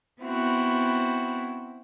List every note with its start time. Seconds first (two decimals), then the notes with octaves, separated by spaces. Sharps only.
0.22 B3 C4 E4 F#4